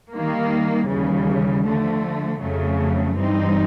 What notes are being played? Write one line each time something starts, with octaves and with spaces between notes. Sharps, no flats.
D#3 G3 A#3
D#2 C#3 E3 G3
D3 F3 A3
F2 C#3 F#3 A3
G2 E3 G3 C4 D#4